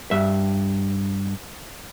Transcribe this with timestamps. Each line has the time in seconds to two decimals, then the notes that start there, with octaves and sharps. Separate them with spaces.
0.11 G2 E5